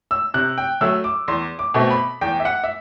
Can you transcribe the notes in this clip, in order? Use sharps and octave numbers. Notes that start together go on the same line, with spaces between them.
E6
C3 F#6
G5
F#3 A3 E6
D6
E2 C6
D6
B2 A3 C4
B5
E2 G5
E5
F#5
E5